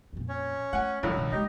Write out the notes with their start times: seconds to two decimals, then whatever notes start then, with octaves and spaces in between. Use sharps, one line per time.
0.13 F2 A#2
0.29 C#4 C#5
0.73 A3 F#5 G#5
1.03 C#2 G2 F3 F#3
1.16 B2 D#3
1.32 G#3 A#3 D#4 G4 D#5